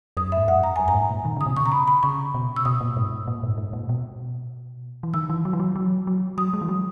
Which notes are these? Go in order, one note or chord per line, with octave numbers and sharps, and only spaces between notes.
F#2 D#6
G#2 E5
F#2 F#5
A#5
F#2 G#5
F#2 A#5
G#2
A#2
D#3
C#3 D#6
B2
C#3 C#6
A#5
B5
B5
C#3 C#6
B2
E6
B2 D#6
A#2
G#2
A#2
G#2
G#2
A#2
B2
E3
D#3 E6
E3
F#3
E3
F#3
F#3
F#3
F#3 D#6
G#3
E3
F#3